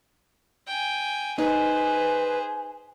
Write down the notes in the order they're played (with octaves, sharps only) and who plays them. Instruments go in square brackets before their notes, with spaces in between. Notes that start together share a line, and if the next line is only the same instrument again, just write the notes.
[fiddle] G5 G#5
[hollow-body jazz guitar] D#4 [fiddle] G#4 C5 [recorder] B4 [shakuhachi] G#5